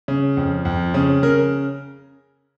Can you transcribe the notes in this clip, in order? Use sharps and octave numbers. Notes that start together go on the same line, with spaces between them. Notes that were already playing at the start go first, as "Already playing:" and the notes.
C#3
F2
F2
C#3
C#3 A#4